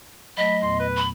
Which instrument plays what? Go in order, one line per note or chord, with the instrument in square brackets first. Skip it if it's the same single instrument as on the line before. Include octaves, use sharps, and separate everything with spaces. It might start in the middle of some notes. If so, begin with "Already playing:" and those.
[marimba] F#3 A3 [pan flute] D#5 [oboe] B5
[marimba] E2 A#2 B3 [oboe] C6
[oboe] B4
[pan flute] B5